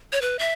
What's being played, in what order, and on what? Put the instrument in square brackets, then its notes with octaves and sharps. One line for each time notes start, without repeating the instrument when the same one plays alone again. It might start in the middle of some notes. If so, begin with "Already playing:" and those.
[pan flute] C#5
B4
E5